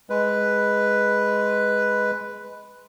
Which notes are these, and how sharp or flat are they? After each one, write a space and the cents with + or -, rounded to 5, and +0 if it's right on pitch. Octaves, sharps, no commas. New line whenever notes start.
G#3 +0 B4 +0